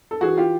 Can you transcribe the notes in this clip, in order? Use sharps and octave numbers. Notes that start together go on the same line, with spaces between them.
A4
E3 F#4 G#4
F4 G4